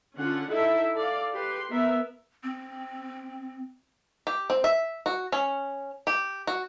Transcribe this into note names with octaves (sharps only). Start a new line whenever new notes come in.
D3 C#4 F4 F#5
D#4 E4 A4 E5
A4 D5 F5
G4 B4 C6
B3 A#4 E5
C4
G4
C4
E5
F#4
C#4
G4
F#4